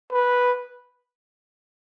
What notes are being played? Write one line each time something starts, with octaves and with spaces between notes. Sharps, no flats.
B4